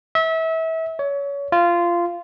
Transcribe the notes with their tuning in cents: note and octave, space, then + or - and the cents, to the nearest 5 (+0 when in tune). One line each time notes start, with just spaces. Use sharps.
E5 -30
C#5 +25
F4 -15